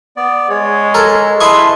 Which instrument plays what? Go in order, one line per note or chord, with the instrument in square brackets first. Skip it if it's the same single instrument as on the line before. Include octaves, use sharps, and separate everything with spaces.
[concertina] B3 D5
[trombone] G#3 [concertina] C#5
[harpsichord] A4 A#4
[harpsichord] E4 D#5 C#6 [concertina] B4 A5 C6